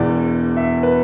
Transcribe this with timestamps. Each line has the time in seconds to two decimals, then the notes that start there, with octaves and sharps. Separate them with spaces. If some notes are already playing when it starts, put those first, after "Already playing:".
Already playing: E1 E2 E3 D5
0.57 E5
0.83 B4